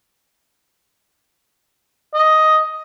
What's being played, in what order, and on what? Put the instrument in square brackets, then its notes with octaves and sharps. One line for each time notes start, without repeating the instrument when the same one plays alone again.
[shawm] D#5